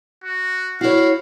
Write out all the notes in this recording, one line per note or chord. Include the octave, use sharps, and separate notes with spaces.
F#4
E4 F#4 C#5 F5